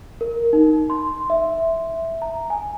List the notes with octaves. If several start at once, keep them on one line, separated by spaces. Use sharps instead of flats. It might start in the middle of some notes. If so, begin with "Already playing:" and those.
A#4
D#4
C6
E5
A#5
G#5